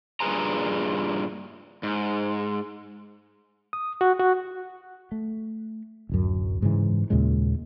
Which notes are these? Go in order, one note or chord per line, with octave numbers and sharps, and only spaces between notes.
G2 A#2 G#4 B4 G#5 A#5
G#2
D#6
F#4
F#4
A3
D1 A1 F#2
G#2 C#3 E3
D#2 A#2 C#3 G#3